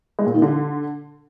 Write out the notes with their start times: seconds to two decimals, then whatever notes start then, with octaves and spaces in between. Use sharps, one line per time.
0.19 G#3
0.26 A#2
0.34 D#3
0.42 D3